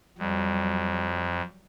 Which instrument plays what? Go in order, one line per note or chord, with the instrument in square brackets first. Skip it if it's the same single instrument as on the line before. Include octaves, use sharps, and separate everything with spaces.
[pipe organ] F2 [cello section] F#3 G3